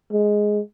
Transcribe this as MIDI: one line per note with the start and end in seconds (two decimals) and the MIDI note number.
0.12 0.60 56